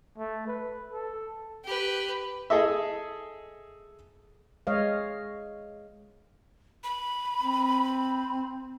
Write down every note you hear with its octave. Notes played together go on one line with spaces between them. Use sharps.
A3
B4
A4
G4 B4
G#4 A4 D#5 E5
G#3 C#5 D#5 F5
B5
C4